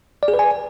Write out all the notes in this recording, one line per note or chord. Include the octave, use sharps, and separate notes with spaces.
D5
G#4
B4
G#5